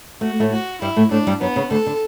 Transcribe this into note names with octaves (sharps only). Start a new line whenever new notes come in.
A3 F#4
A2 A3
F#4
G2 G3 E4
A2 A3
A2 A3 D4
G2 G3
F#2 F#3 B3
C#3
D2 D3 A4
D3